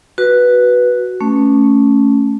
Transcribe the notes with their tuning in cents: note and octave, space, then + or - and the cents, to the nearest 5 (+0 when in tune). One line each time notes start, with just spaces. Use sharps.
F#4 +0 B4 -5
A3 +0 C#4 +0